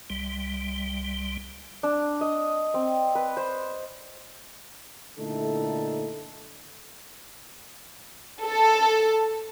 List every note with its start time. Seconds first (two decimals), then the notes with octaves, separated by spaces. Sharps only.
0.10 C2 G3
1.83 D4
2.21 D#5
2.74 C4
3.15 B4
3.37 C5
5.19 A#2 D3 A3 D#4 E4 A4
8.44 A4